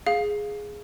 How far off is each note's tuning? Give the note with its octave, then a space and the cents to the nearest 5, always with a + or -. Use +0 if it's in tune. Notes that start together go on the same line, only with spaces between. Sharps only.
G#4 +0 F5 +5